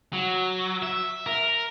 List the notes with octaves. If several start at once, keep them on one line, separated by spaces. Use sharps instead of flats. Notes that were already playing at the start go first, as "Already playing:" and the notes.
F#3
E5
A#4